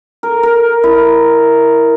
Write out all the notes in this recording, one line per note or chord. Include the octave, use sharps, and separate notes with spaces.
A#4
A#4
E4